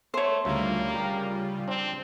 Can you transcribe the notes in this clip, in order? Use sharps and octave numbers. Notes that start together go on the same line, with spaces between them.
A3 C5 C#5
D2 C#3 G3 A#3 F4 E5
G4 A#4
C4 D4 G5